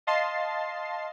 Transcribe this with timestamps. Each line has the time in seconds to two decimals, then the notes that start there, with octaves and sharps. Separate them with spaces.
0.07 D#5 F5 A5 C6 A6 C7